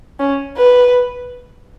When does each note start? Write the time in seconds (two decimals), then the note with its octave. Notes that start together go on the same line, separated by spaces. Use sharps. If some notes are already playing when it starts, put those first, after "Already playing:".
0.20 C#4
0.57 B4